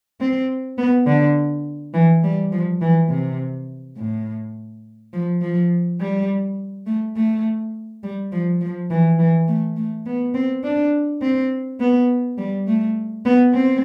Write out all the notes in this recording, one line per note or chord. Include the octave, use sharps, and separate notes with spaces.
C4
B3
D3
E3
G3
F3
E3
C3
A2
F3
F3
G3
A3
A3
G3
F3
F3
E3
E3
A3
A3
B3
C4
D4
C4
B3
G3
A3
B3
C4